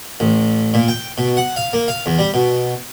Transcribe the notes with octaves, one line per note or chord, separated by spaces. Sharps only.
A1
A#2
G5
B2
F#5
F5
A#3
F5
E2
G3
B2